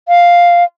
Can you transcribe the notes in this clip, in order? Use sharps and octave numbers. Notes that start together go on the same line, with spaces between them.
F5